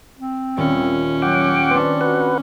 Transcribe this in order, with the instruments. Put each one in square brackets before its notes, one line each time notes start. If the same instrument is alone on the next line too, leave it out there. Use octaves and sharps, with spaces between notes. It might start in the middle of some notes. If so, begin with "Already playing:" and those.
[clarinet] C4
[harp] D#1 [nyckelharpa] C#4
[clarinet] F#3 [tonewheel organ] F#5 G5 D6
[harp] C4 D4 [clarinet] B4
[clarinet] F#4 [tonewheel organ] B4 F#5